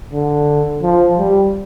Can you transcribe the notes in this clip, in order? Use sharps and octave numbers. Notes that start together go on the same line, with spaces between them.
D3
F3
G3